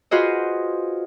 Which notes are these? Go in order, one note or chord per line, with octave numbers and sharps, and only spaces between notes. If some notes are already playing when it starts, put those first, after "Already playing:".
F4 F#4 G#4 B4 C5 D#5